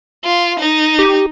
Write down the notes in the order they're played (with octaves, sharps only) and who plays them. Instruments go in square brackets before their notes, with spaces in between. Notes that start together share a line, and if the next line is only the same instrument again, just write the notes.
[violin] F4
D#4
[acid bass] G4